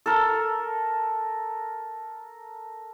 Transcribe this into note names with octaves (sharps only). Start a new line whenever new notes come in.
A4 A#4